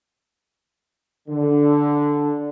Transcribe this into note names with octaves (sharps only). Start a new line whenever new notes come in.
D3